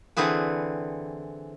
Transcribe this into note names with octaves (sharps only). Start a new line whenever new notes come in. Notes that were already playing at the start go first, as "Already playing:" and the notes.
D3 E3 C4 G#4 B4